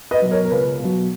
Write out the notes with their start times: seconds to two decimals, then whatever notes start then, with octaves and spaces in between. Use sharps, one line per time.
0.11 B4 D#5
0.22 B2 F#3
0.31 A#4 C#5
0.45 A#4
0.50 C#2 B4
0.80 B2 F#3